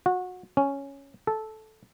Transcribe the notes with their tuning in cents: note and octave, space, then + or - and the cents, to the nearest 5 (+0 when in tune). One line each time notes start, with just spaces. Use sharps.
F#4 -25
C#4 +0
A4 -10